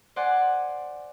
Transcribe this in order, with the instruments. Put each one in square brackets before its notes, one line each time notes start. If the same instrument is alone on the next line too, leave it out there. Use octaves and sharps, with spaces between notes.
[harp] C5 D5 F#5 G#5